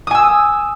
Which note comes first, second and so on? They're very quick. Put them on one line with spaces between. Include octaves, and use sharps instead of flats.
D#6 G#5 E6